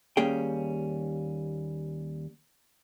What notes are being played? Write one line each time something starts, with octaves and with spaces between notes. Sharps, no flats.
D#2 G3 A#3 C#4 G#4 G5